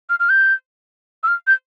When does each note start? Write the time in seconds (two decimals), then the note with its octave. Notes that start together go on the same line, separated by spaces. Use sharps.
0.09 F6
0.20 F6
0.29 G6
1.23 E6
1.28 F6
1.47 G6